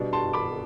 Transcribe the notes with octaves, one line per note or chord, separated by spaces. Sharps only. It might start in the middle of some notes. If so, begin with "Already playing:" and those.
Already playing: B2 G3 B3 D4
A5 C6
B5 D6